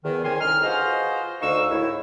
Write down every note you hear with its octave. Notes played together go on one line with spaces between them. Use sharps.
E2 D#3
C2 C#4 G4 A#4 G#5 C6
C2 D3 D#4 F6
F4 F#4 G#4 B4 C5 D#5
D2 D#4 F5 C#6 E6
A2 D#3 G#3 E4